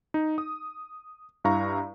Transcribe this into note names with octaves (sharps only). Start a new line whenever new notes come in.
D#4
D#6
G2 E4 F5 A#5 C#6